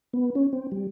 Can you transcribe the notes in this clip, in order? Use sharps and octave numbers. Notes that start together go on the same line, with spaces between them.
B3
C#4
C4
G3